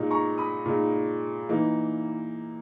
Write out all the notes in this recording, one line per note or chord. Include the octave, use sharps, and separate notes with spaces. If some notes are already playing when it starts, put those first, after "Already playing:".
Already playing: A#2 G#3 D#4
A#5 C#6
B5 D#6
A#2 G#3 D#4
E3 A#3 D#4